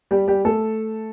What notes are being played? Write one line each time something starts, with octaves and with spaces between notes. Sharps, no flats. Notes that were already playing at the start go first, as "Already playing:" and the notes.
G3 G4
G3 G4
A3 A4